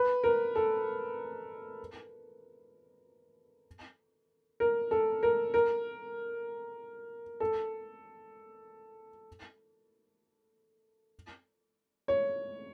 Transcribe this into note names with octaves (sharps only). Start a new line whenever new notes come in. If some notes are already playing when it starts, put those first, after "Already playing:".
Already playing: B4
A#4
A4
A#4
A4
A#4
A#4
A4
C#5